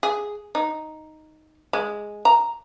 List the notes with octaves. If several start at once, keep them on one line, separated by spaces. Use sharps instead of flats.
G#4
D#4
G#3
A#5